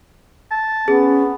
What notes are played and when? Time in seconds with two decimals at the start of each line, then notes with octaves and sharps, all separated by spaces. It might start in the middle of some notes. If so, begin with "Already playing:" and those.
0.51 A5
0.88 B3 C#4 G#4